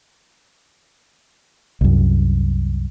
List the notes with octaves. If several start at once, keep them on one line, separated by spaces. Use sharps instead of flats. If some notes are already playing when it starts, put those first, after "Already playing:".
C2 F#2